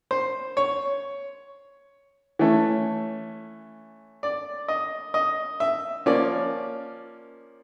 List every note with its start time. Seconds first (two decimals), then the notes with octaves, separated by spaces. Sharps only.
0.11 C5
0.57 C#5
2.39 E3 A3 C#4
4.23 D5
4.68 D#5
5.14 D#5
5.60 E5
6.06 F3 A#3 C#4 D5